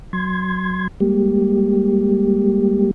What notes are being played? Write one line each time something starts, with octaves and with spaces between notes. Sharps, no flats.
F#3 C6 G#6
G3 G#3 A#3 G4